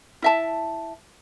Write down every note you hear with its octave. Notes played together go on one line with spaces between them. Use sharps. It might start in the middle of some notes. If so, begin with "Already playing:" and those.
E4 E5 A5